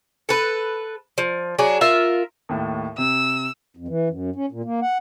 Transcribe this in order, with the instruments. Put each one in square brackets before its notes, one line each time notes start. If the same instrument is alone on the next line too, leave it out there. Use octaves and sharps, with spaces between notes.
[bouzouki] A4 B4
F3
F#3 D4 G#4
F4 A#4 E5
[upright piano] D#2 A2
[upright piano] C3 [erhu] E6
[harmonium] F2
E3
F#2
C#4
A#2
A#3
F#5